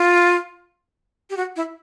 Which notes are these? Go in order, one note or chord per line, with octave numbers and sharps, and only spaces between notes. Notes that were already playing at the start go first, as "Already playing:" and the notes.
Already playing: F4
G4
F#4
E4